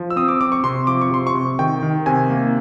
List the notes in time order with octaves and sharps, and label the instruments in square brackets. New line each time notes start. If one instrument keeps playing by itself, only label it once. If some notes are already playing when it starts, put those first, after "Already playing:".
Already playing: [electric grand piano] F3
E6
C4 D#6
D6
C4 D6
C#6
C3 C6
F3 D6
C#6
C3 C6
C#6
C3
D#3 G5
D#3
C3 G#5
A#3